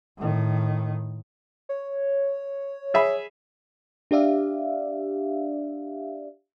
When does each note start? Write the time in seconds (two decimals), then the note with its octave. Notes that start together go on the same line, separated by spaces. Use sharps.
0.18 A2 D#3
1.69 C#5
2.94 G#4 E5 B5
4.11 D4 G4 D5 E5 F5